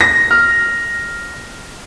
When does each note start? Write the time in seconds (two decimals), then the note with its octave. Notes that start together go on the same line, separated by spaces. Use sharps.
0.01 A#6
0.31 F6